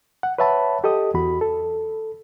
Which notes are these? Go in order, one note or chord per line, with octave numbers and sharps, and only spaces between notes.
F#5
B4 C#5 E5 F#5 A5 B5
G4 A4 D#5 D#6
E2 F#4 B5
A4